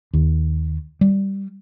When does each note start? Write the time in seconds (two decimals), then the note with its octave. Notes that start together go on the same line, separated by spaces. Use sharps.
0.14 D#2
1.01 G3